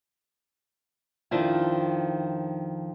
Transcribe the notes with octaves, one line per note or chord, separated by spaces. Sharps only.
F2 D#3 F3 D4 E4 F4